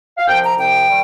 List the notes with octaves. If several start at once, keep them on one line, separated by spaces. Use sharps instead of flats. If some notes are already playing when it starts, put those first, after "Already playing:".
F5
C2 C3 F3 G5
A#5
C2 C3 F3 G5
D#3 G3